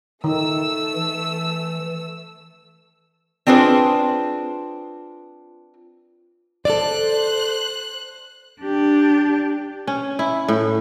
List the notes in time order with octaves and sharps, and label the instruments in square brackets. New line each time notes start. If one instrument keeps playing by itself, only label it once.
[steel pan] D#3 [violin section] A3 E6
[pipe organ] E3
[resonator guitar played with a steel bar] C4 D4 F4 G#4 B4 C5
[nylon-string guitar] A4 D5 [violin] C5 F#6
[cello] D4 G4
[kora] C#4
E4
A2